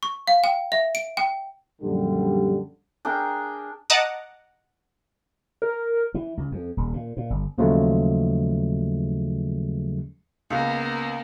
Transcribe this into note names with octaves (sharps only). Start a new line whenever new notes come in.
C#6
F5
G5
E5
D7
G5
A#1 F#2 D3 G3
D4 G#4 A#4 G5
D#5 F#5 A5 A#5 D6 D#6
A#4
E3
C#2
F2
D#1
A#2
A#2
G1
D#2 C#3 F3 F#3 G#3 A3
C#2 A#3 B3